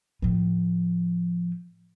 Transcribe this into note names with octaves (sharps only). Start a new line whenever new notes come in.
A2 F3